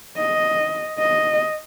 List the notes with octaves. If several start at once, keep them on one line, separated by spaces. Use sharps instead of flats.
D#5
D#5